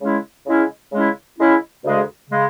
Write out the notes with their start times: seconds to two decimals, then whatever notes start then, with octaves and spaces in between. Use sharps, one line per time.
0.01 C#3 G#3 C#4 E4
0.46 C#3 G#3 C#4 E4
0.92 C#3 G#3 C#4 E4
1.39 C#3 G#3 C#4 E4
1.84 D2 C#3 G#3
2.30 C#3 G#3